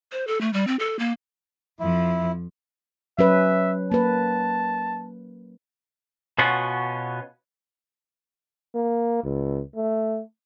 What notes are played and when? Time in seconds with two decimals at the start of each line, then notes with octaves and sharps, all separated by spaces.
0.12 C5
0.27 A4
0.41 A3
0.53 G3
0.67 C4
0.79 A4
0.99 A#3
1.80 F2 F3 E4
3.19 F#3 C#4 B4 E5
3.92 A#3 B4 A5
6.38 B2 B3 C#4 F4 F#4
8.75 A#3
9.24 C#2
9.76 A3